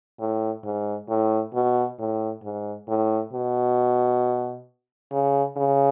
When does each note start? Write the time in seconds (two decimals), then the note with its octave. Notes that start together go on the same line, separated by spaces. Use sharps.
0.20 A2
0.64 G#2
1.09 A2
1.54 B2
1.99 A2
2.43 G#2
2.88 A2
3.33 B2
5.12 C#3
5.57 C#3